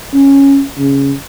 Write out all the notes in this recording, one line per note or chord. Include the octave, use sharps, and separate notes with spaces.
C#4
C#3